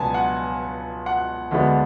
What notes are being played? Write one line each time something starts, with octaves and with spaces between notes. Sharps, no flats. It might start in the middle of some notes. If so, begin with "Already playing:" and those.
Already playing: C#2 B2 F#3 B3 D4 G#5 A5
F#5
F#5
D2 D3 G#3 B3 D4